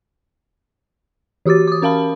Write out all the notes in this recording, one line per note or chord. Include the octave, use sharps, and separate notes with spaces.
E3 F#4 G4 D6 A6
D6 D#6
C#4 A#4 F5 A5 B5